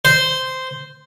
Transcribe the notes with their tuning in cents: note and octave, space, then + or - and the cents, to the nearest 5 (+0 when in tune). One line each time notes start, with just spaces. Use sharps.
C5 -10